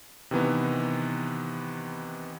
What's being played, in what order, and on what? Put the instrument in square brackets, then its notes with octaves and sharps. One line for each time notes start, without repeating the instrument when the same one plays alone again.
[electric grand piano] C3 D#3 E3 B3